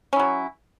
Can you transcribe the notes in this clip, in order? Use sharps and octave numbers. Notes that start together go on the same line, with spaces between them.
F#3 C#4 E4